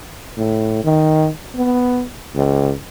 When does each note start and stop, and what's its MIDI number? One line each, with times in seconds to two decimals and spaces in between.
0.37 0.81 45
0.84 1.29 51
1.55 2.04 59
2.35 2.73 37